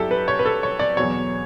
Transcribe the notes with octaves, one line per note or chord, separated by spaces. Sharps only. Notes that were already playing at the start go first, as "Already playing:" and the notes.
Already playing: G2 F#3 E4 G4 A4
B4
C#5
B4
A4
C#5
D5
E2 B2 F#3 C#5